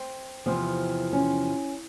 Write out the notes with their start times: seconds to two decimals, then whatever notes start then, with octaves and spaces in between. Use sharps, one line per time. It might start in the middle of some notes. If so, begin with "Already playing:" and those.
Already playing: C4
0.46 E2 C3 F3
1.13 C#4